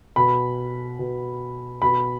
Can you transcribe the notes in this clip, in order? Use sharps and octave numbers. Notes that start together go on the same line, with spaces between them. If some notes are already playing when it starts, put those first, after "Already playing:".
B2 B5
B2
B2 B5